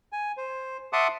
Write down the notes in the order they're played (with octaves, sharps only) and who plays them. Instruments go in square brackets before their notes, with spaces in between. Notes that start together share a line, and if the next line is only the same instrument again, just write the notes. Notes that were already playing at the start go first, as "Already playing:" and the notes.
[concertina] G#5
C5
E5 F#5 A5 C6 D6 D#6